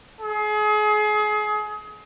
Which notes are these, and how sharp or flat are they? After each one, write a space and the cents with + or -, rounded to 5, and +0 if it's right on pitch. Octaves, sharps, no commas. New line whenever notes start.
G#4 +30